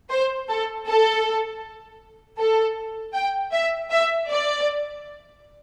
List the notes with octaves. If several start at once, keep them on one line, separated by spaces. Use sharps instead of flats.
C5
A4
A4
A4
G5
E5
E5
D5